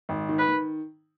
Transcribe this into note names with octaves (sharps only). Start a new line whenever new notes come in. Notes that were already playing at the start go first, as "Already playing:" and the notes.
G#1
D#3
B4
D#3